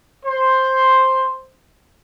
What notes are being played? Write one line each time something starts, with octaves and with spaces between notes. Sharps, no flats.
C5